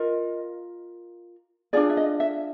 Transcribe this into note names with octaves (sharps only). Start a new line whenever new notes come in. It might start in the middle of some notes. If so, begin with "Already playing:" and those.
Already playing: F4 A#4 D#5
D4 F4 G#4 D5
E5
D#5
E5